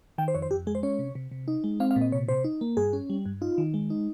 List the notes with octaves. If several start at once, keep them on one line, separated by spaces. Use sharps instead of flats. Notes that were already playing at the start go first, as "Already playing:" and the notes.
D#3 G5
C5
F2 C#5
C5
F2 G4
G#3 G#4
C5
C#4 C#5
C3
C3
C3
D#4
G#3
C4 F5
F5
A#2
D#5
C3 C#5
C3 C5
D#4
A#3
G2 G#4
C#4
G3
G2
D#4 F4
D#3
G#3
D#4